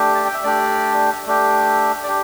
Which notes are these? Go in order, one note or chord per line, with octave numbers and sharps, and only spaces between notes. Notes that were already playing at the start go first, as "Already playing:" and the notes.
Already playing: A3 D4 G4
A5
G5
E5
A3 D4 G4 D5
A3 D4 G4
D5
D4 G4